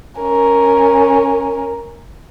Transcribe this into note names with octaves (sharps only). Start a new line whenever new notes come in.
C#4 A#4